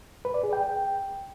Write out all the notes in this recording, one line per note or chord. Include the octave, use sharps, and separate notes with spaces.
B4
D5
G#4
G5